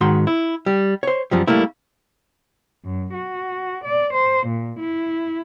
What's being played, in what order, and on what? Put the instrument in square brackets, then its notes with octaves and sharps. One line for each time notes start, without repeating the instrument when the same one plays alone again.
[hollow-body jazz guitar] G#2 D#3 F#4 C6
E4
G3
C5 C#5
F#2 F3 G3
G3 A3 A#3 E4
[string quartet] F#2
F#4
D5
C5
A#2
E4